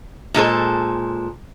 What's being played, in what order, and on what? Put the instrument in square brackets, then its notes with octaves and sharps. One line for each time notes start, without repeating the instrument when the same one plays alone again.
[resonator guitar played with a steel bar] A#2 G#3 A4 C5